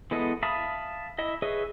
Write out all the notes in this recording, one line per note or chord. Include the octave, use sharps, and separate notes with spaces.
E3 G#3 B3 A4 D#5
E5 F5 A5 B5 D#6
E4 D#5 E5
G#4 B4 C#5 D#5 E5